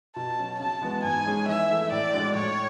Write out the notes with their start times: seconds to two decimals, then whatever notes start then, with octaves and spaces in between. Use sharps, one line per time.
0.15 B2 A5
0.39 F#3 C#4
0.59 C#3 A5
0.82 E3 G#3 B3 F#4
1.03 G#2 G#5
1.25 G#3 C#4 G#4
1.48 E3 E5
1.70 A3 E4 A4
1.92 A2 D5
2.14 G#3 D4 F#4
2.35 A2 C#5